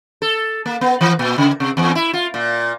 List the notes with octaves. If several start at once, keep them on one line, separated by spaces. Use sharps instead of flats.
A4
A#3
B3
E3
A#2
C#3
C3
E2
E4
F4
A#2